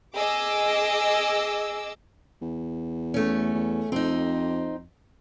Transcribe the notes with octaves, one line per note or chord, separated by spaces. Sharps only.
G#4 D#5 D6 E6
E2
A3 C#4
E2
F2 C4 D#4